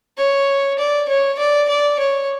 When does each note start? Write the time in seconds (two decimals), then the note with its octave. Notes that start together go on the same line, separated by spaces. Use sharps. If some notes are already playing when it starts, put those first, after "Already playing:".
0.18 C#5
0.79 D5
1.08 C#5
1.39 D5
1.69 D5
1.99 C#5